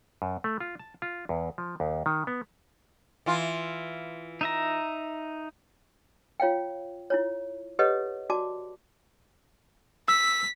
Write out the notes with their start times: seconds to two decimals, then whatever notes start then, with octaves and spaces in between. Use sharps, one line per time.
0.22 F#2
0.44 A3
0.60 F4
0.79 A5
1.02 F4
1.29 E2
1.58 F3
1.80 D#2
2.06 D#3
2.27 B3
3.26 E3 F4
4.41 D#4 E5 A#5
6.40 F4 C#5 F5 G5
7.10 E4 F4 C#5
7.79 G4 A4 B4 C#5 D#5 F#5
8.30 F#4 D5 A5 D6
10.08 E6 B6